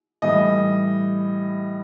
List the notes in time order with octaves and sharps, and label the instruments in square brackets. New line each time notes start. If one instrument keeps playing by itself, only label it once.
[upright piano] A2 E3 G3 D#5